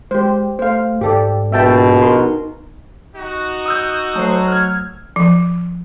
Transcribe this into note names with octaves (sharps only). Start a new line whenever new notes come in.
G#3 G4 C5
A3 C5 F5
G#2 G4 A4 D5
A#1 B2 E5 G5 A5
D#4 A#4 C6
D#4 F#4
D#6 E6 G6
F#3 A3 C5
F6 G#6
F3